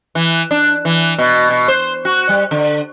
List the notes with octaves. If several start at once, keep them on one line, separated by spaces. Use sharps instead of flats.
E3
D4
E3
B2
B2
C5
F#4
G3
D3